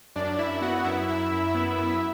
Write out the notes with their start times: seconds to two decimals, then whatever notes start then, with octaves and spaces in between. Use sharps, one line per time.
0.16 F#2 D4 D5
0.39 F#2 E4 E5
0.61 B3 F#4 F#5
0.85 F#2 E4 E5
1.08 F#2 E4 E5
1.31 F#2
1.55 B3
1.78 F#2